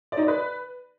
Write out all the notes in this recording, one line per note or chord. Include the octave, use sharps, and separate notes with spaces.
D5
D#4
D5
B4